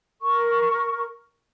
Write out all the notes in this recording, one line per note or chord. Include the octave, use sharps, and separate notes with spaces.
A#4 C#6